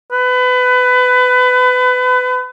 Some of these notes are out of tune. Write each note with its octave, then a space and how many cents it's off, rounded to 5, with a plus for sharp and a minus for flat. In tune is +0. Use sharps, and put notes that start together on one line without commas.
B4 +25